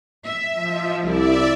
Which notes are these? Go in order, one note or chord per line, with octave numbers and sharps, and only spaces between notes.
E5
F3
C2 E4 D5 E5